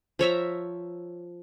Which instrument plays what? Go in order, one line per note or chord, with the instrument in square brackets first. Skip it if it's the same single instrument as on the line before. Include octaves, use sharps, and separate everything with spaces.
[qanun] F3 C#5 E5 A#5